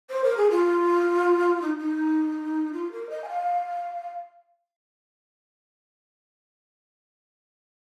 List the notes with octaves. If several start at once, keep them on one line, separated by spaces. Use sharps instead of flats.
C5
A#4
G#4
F4
D#4
D#4
F4
A#4
D#5
G#5
F5